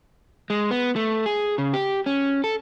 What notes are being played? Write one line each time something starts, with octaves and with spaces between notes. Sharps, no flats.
G#3
B3
A3
G#4
C#3
G4
C#4
A4